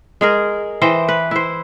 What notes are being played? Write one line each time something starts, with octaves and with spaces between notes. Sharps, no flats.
G#3 G#4 A#4
E3 C5 D#5 G5
B4
E4 C5